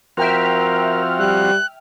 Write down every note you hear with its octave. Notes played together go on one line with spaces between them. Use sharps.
F3 C4 F#4 A#4 E5 G5 F6
G3 F#6